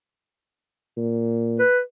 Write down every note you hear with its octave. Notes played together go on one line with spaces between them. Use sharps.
A#2
B4